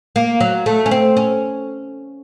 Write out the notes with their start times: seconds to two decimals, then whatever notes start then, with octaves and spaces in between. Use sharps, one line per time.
0.16 A#3
0.40 F#3
0.66 A3
0.86 C#4
0.91 C4
1.17 C#4